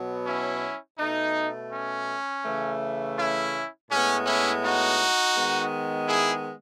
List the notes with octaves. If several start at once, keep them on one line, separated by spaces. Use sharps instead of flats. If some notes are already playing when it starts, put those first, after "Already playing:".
Already playing: B2 F#3 B3
C#4 E4
B2 A3 D#4
C#4
C#3 E3 A3
C#4 E4
A2 G#3 B3 C#4
C#4 E4
D#4 F#4
D#3 G#3 B3
E4 G#4